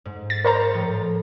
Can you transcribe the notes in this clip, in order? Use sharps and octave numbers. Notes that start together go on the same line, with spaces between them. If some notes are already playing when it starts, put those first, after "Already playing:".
G#2
A6
A#4 C5 A#5 C#7
A2 F3